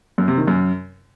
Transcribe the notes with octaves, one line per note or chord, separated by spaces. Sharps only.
F#2
C3
D#3
F#2